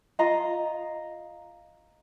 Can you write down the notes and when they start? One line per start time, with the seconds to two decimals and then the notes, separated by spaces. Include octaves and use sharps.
0.19 F4 D#5 A#5